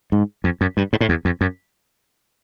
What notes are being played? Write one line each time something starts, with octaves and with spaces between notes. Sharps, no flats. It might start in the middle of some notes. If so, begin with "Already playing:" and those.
G#2
F2
F#2
G2
G#2
A2
E2
F2
F#2